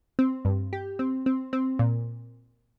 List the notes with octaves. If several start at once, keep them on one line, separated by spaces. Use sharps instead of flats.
C4
G2
G4
C4
C4
C4
A#2